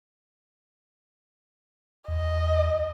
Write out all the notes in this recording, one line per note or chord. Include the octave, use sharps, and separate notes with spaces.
E2 D#5